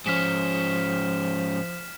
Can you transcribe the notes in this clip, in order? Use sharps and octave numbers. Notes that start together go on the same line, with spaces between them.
G#2 F3 C#4 F6 B6 E7